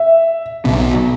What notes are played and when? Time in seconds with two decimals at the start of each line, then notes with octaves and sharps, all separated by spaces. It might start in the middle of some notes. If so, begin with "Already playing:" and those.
Already playing: E5
0.65 B1 B2 B3